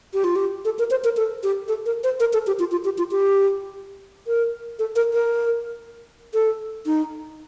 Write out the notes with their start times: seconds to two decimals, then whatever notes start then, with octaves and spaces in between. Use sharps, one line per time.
0.14 G4
0.24 F4
0.36 G4
0.65 A4
0.79 A#4
0.91 C5
1.04 A#4
1.17 A4
1.43 G4
1.68 A4
1.86 A#4
2.04 C5
2.20 A#4
2.33 A4
2.47 G4
2.59 F4
2.72 F4
2.84 G4
2.98 F4
3.11 G4
4.27 A#4
4.79 A4
4.96 A#4
5.14 A#4
6.34 A4
6.86 D#4